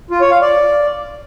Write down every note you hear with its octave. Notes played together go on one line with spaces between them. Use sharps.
F4
C#5
F5
D5